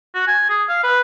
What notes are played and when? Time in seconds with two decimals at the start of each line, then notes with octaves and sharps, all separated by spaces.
0.15 F#4
0.27 G#5
0.50 G#4
0.69 F5
0.84 B4